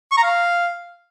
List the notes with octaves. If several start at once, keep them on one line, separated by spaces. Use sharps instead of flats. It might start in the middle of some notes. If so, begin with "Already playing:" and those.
C#6
A#5
F5